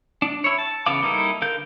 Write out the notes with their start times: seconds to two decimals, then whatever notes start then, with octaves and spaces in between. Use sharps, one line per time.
0.22 D4
0.44 E4 C#5
0.58 A5
0.86 C#3 E3 B3 F5 D6
1.02 G3 A#3 D#4 E4 A4
1.42 D3 A#4 F5 G6